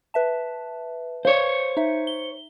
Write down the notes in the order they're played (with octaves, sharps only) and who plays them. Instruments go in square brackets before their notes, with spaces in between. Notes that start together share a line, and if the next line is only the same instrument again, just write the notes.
[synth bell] B4 E5 A5
[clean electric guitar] C5 C#5 [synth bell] F5
[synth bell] D#4 E5
G7